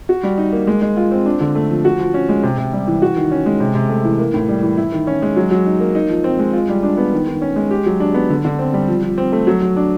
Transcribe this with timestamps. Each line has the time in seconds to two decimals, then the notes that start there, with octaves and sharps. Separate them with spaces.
0.09 F#4
0.23 G3
0.38 D#4
0.53 A#3
0.67 G#3
0.82 G#3
0.97 F4
1.11 C4
1.26 D4
1.41 D3
1.55 A3
1.70 F3
1.85 F#4
1.99 F3
2.14 C#4
2.29 G#3
2.43 C3
2.57 C3
2.73 G3
2.87 E3
3.02 F#4
3.17 D#3
3.31 C#4
3.46 G#3
3.60 C3
3.75 C3
3.89 A3
4.05 E3
4.19 A#3
4.34 A2
4.49 G3
4.63 E3
4.77 E4
4.92 D#3
5.07 C#4
5.22 G#3
5.36 F#3
5.51 F#3
5.66 D#4
5.80 A#3
5.95 D#4
6.09 F3
6.24 C4
6.39 G#3
6.53 F4
6.69 G3
6.83 D4
6.97 B3
7.13 D#3
7.27 D#3
7.42 C#4
7.56 G#3
7.71 G4
7.86 F#3
8.00 D4
8.14 B3
8.30 D3
8.45 D3
8.59 C4
8.74 G3
8.88 F3
9.03 F3
9.18 C4
9.32 A3
9.47 F#3
9.62 F#3
9.77 D4